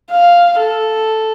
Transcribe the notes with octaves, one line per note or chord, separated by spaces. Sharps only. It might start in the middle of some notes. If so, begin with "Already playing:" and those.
F5
A4